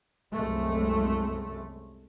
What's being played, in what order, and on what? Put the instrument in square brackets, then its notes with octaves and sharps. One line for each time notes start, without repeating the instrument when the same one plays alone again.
[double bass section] C2 F#2 C3 G#3 A3